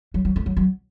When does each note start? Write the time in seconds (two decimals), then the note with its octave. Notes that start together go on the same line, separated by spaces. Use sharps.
0.14 F#3
0.25 F#3
0.36 A3
0.46 F#3
0.57 F#3